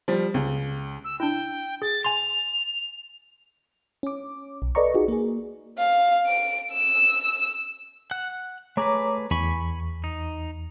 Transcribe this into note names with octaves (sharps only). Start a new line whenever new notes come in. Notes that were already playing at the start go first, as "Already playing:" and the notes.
F3 G3
C#2
E6
D4 E4 G5
G#4 A6
G#5 C6 F7
C#4 D6
B1
A4 B4 D5 D#5 A#5 C#6
D#4 F4 F#4 G#4
A#3 G#4
F5
D7
E6
F#5 F#6
A3 G#4 B4 C#5 A#5 D6
E2 G#5 B5 C#6
D#4